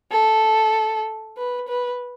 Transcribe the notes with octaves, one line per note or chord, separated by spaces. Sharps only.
A4
B4
B4